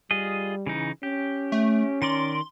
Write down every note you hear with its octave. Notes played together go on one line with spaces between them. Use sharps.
G3 F4 G#4 D#5
C#3 E3 D#4
C#4 G4
A3
D#3 A#4 D5 C6